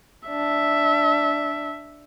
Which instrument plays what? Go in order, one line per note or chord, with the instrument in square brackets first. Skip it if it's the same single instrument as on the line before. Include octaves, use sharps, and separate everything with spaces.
[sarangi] D4 [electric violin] E5